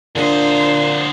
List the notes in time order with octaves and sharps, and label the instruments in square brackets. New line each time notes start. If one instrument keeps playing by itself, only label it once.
[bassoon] A#2 [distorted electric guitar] D3 D#5 [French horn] D4 [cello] C5